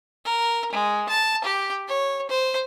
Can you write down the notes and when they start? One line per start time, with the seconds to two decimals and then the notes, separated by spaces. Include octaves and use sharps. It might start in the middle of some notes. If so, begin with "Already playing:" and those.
0.25 A#4
0.72 G#3
1.09 A5
1.44 G4
1.88 C#5
2.29 C5